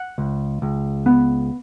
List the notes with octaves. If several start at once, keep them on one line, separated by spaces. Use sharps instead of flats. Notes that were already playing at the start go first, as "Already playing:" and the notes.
Already playing: F#5
C#2
C#2
B3